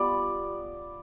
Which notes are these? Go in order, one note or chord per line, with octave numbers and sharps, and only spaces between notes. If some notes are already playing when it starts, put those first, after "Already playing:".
Already playing: G3 B3 F4 D5